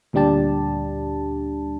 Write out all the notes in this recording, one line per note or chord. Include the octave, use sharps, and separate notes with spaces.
D2 A#2 G3 D4 G4 A5